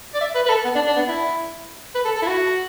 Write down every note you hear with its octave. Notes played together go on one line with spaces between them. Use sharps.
D5
E5
B4
B4
A4
B3
D4
D4
B3
E4
B4
A4
A4
E4
F#4